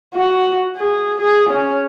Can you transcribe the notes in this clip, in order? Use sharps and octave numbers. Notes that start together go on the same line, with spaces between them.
F#4
G#4
G#4
C#4